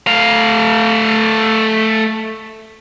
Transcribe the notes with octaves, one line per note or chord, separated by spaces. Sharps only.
A3 F5